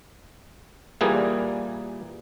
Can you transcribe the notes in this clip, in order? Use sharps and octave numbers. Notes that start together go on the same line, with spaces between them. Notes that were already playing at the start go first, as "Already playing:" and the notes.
A#2 E3 G3 A#3 G#4